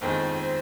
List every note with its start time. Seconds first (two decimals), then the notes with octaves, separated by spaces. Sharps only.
0.01 G1 F2 D#3 G#3 C5
0.39 C5